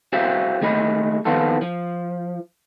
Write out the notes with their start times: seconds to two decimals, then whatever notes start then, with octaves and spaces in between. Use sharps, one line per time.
0.13 F#4 G#4 C5 E5 F5 G5
0.61 D#2 A3 G#4 D#5 B5
1.25 D#2 D#3 F3 B3 F4 A4
1.61 F3